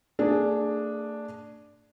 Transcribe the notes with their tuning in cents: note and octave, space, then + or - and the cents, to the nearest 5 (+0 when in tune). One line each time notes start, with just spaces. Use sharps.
A3 +40 D4 +0 G#4 +0